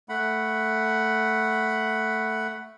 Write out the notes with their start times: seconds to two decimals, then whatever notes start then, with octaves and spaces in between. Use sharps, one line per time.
0.09 A3 F#5 B5